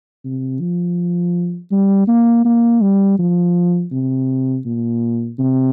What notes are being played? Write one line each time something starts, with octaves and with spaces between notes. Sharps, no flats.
C3
F3
G3
A#3
A#3
G3
F3
C3
A#2
C3